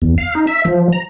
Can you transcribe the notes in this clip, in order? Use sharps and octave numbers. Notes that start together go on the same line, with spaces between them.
E2
F5
D#4
E5
F3
A#5